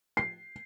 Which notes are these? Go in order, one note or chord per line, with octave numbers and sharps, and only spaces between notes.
C7